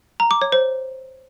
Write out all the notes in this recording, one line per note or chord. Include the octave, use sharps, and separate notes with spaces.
A#5
D6
C#5
C5